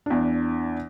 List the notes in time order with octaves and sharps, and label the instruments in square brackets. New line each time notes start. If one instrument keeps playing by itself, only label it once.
[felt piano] E2 D4